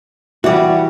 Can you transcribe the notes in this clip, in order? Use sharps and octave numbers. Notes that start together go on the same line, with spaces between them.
E3 G3 F#4 D5